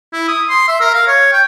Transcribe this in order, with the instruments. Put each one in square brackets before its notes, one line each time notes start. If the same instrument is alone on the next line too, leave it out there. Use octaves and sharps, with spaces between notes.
[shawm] E4
D#6
C6
E5
A#4
F5
C#5
G5